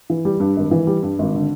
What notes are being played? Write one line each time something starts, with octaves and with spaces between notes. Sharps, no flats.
E3
G3
G2
G#1
E3
G3
G2
G#1
D3